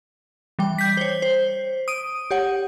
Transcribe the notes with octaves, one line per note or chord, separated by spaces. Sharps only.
E3 G3 G5
G6 B6
C5 C#5
C5
D#6 D7 D#7
G4 C#5 F#5